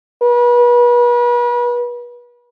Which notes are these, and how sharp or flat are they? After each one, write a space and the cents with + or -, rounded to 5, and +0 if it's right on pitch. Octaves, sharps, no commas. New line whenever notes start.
B4 -35